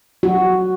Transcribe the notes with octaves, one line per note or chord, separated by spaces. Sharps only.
F#4